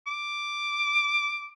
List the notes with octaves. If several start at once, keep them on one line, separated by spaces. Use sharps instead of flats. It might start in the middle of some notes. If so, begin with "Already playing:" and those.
D6